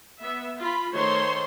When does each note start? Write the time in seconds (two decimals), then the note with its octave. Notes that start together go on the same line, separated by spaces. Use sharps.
0.22 B3 E5
0.58 F4 B5
0.93 D#3 A3 C5 C#5 C6